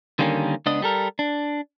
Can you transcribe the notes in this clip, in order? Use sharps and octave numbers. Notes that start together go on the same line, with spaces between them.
D3 D#3 G3 A#3 C4 C#4
C#2 B3 D4 D#5
G3 A4 A#4
D4